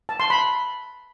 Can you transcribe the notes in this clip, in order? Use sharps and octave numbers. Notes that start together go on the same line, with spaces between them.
A5
C6
B5